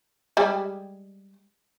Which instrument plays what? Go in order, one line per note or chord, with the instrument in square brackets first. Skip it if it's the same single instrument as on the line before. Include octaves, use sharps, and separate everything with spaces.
[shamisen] G3 G#3 G4